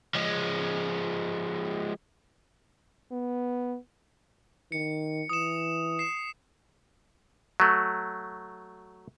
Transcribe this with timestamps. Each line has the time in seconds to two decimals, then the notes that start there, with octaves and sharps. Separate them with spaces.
0.15 F3 G#3
3.12 B3
4.72 D#3 C#7
5.29 E3 D#6 E7
5.99 C7 E7
7.60 F#3 A3